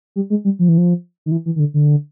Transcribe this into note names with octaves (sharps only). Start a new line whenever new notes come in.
G3
G#3
G3
F3
E3
F3
D#3
E3
E3
D#3
D3
D3